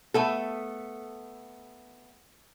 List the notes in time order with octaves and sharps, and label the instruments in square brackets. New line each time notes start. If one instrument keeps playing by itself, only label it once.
[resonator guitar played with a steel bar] A3 B3 A4